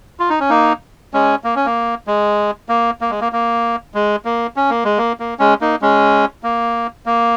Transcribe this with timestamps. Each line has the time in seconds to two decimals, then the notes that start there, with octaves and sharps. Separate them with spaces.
0.20 F4
0.30 D#4
0.40 C#4
0.50 A#3 D#4
1.13 G#3 C#4
1.44 A#3
1.56 C#4
1.66 A#3
2.07 G#3
2.69 A#3
3.01 A#3
3.10 G#3
3.21 A#3
3.32 A#3
3.94 G#3
4.25 A#3
4.56 C#4
4.70 A#3
4.85 G#3
4.98 A#3
5.20 A#3
5.39 G#3 C#4
5.61 A#3 D#4
5.81 G#3 C#4
6.43 A#3
7.06 A#3